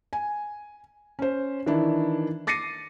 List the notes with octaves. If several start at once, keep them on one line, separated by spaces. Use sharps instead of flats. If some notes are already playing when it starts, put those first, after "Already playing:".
G#5
C#4 C5
D#3 E3 D4 E4
D6 A6 A#6 C7 C#7 D#7